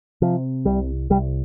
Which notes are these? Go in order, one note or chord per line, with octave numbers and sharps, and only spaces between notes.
C3 F3
C2 G3
C2 G3